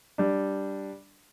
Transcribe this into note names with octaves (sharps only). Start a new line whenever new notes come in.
G3 D4